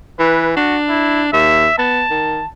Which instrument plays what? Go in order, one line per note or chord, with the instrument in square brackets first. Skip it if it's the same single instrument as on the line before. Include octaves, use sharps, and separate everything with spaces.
[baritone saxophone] E3 [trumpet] B4
[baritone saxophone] D4 [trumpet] F#4
[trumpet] E4
[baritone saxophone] D#2 [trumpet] E5
[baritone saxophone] B3 [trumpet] A5
[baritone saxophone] D#3